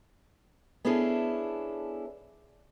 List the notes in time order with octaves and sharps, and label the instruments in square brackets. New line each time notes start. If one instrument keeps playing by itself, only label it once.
[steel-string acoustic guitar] B3 C#4 D4 E4 G#4 A4